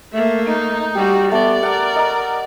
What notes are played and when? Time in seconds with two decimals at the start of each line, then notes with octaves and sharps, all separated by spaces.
0.13 A3 A#3 E5
0.46 D#4
0.95 G3 F#4 G4
1.32 A3 B3 D5
1.63 A#4 F#5
1.96 D#5 A#5